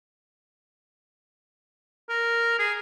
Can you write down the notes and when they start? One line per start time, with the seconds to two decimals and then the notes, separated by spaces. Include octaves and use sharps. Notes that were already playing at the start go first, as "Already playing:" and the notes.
2.09 A#4
2.59 G#4